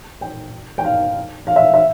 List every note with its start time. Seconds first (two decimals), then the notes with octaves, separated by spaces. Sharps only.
0.21 G5
0.78 G5
0.85 F5
1.47 F5
1.56 E5
1.74 E5